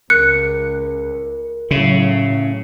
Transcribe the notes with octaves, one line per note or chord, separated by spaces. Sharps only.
C#2 A#4 F#6 C#7
A2 C#3 F#3 E5